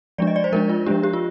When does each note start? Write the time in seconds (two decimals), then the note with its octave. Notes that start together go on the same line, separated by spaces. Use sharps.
0.18 F3 G#3 D4 D5
0.27 D#5
0.36 D5
0.44 C5
0.52 F3 G#3 D4 A#4
0.69 F4
0.86 F3 G#3 D4 G4
1.03 G4
1.13 F4